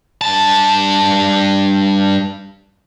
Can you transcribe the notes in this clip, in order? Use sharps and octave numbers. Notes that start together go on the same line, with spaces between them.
G2 A5